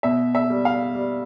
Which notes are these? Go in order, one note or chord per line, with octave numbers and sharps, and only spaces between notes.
B2 E5
E5
G3
F5
G3